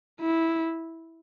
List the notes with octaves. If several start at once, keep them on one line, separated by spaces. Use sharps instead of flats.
E4